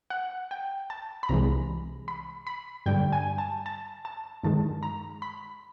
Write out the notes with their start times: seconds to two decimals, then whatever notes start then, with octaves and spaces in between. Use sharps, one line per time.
0.10 F#5
0.51 G5
0.90 A5
1.23 B5
1.29 C2 C3 E3 G#3 A#5
2.08 B5
2.47 B5
2.86 G2 D3 G3 G5
3.12 G#5
3.38 A5
3.66 A5
4.05 A5
4.44 G2 D#3 G#3 A5
4.83 A#5
5.22 B5